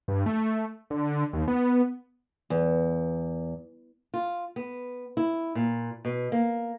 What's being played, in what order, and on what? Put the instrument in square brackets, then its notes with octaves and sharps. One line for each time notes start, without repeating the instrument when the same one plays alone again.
[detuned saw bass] G2
A3
D3
D#2
B3
[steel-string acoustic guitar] E2
[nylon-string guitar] F4
B3
E4
A#2
B2
A#3